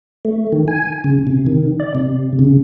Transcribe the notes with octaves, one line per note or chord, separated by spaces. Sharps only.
A3
D#3
G#5
C#3
C3
D#3
D5
C3
C#3